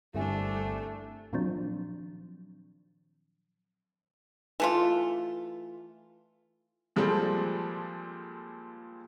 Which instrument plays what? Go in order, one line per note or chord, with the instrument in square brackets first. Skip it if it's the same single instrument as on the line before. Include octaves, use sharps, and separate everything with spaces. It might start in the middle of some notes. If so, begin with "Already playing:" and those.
[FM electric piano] G1 [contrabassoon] C2 [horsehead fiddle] A3 D4 [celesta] A4 E5 G#5
[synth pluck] A#2 D#3 F3 F#3 C4 D4
[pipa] E3 A3 F4
[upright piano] A#2 F3 G3 G#3 C4 A4